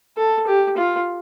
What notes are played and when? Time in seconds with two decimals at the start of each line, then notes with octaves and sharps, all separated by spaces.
0.17 A4
0.47 G4
0.77 F4